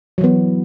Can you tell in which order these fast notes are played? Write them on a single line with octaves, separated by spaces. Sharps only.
F#3 E3 B3